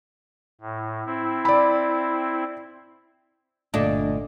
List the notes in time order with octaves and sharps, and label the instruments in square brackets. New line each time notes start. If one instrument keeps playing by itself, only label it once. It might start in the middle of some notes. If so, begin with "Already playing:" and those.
[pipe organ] A2
C4 E4
[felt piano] D5 B5
[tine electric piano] G1 A3 D#5 [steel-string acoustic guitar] A#2 [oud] D4